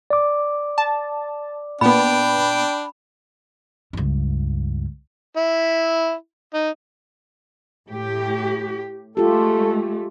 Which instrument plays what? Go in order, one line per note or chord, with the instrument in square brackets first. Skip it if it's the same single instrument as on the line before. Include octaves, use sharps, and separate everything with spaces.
[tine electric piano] D5 D6
[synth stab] A5
[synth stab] A#2 B3 [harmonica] D4 G5 [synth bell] B5
[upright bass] C#2 G2
[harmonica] E4
D#4
[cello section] A2 G4
[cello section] G#3 A3 [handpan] F4 G4 [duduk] A4